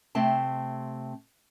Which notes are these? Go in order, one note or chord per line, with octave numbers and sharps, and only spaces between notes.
C3 A3 C4 A5